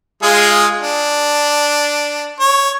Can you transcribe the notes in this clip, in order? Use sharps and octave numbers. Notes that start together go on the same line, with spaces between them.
G#3 F4 G#4
D4
C#5